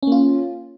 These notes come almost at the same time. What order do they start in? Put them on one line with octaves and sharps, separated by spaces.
C#4 A#3 F4